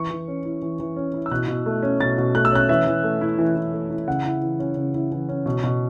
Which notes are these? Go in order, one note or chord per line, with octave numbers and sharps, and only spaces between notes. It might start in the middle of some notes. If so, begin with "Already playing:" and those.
Already playing: E3 C#6
E3
C#4
E4
E3
E3
C#4
E4
E6
B2 F#6
B2
A3
C#4
B2 A6
B2
A3 F#6
E6
C#4 F#6
E3 E5
E3
A3
E4
E3
E3
A3
E4
C#3 F#5
E4
E3
C#4
C#3
E4
E3
C#4
B2
B2